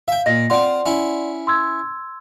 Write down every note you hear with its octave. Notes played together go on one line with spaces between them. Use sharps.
E5 F5 G5
A#2 D#5 A#6
C4 F4 D5 F#5 C6
C#4 E4
C6 E6 G#6